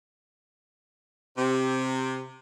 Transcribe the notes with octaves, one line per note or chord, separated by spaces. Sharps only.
C3